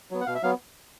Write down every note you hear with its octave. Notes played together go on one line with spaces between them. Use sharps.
F#3 B3
F#5
B2 F5
E5
F#3 B3 F5